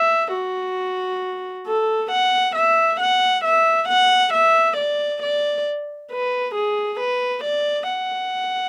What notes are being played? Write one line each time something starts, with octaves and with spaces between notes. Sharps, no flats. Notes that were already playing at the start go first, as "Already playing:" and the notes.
Already playing: E5
F#4
A4
F#5
E5
F#5
E5
F#5
E5
D5
D5
B4
G#4
B4
D5
F#5